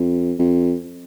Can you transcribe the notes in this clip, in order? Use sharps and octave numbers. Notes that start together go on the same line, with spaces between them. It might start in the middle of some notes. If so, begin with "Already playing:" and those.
Already playing: F2
F2